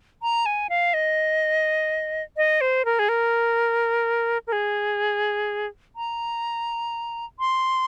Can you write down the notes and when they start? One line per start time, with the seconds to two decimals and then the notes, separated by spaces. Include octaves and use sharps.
0.22 A#5
0.46 G#5
0.69 F5
0.94 D#5
2.37 D#5
2.61 C5
2.85 A#4
2.99 G#4
3.09 A#4
4.47 A#4
4.52 G#4
5.96 A#5
7.39 C6